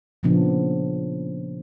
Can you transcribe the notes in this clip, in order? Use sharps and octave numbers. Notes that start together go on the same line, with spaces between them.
A#2 C#3 F3 B3 D4